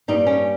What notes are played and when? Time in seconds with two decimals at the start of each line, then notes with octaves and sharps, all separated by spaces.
0.08 G2 G3 A#3 D#4
0.27 C#4